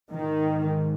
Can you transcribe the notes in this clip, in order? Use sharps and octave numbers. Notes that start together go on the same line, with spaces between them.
G#2 D#3